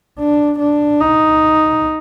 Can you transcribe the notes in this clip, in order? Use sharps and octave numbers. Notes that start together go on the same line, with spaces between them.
D4
D4
D#4